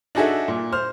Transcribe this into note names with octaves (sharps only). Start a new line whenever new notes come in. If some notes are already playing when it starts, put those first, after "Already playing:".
D4 D#4 F#4 G#4 A4 E5
A#2
C5 F6